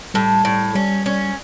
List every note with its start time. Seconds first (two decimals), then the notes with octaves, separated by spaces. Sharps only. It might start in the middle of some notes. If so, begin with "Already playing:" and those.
0.14 A2 G3
0.45 A2
0.75 G3 C#4
1.06 C#4